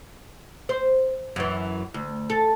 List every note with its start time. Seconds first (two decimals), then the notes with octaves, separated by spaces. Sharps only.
0.69 C5
1.36 F#2 E3
1.94 D2
2.30 A4